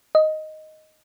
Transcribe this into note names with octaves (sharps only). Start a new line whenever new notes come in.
D#5